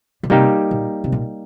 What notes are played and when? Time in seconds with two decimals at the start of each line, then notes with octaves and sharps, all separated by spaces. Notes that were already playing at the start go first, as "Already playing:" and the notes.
0.23 A#2
0.30 C3 G3 A#3 D#4 G4
0.71 A#2
1.04 C3
1.12 A#2